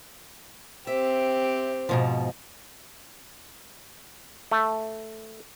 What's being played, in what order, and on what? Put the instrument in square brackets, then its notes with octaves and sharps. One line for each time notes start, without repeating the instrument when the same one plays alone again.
[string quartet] C4 G4 [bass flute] C5 [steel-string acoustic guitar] E5
[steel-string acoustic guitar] G#2 B2 F3
[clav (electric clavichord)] A3